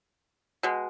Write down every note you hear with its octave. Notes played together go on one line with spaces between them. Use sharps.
B2 G#3